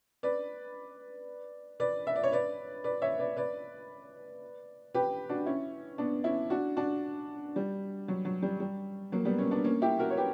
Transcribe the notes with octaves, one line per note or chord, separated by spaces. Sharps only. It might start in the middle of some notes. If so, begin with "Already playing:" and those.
B4 D5
B4 D5
E5
D5
C#5
B4 D5
B4 D5
C#5 E5
B4 D5
B4 D5
G4 B4
D4 F#4
C#4 E4
B3 D4
C#4 E4
D4 F#4
D4 F#4
G3
F#3
F#3
G3
G3
F#3 A#3
G3 B3
A#3 C#4
B3 D4
A#3 C#4
E4 G4
F#4 A#4
C#5
G4 B4